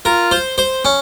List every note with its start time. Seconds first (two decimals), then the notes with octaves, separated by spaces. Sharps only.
0.05 F4 A#4
0.31 C5
0.58 C5
0.85 C#4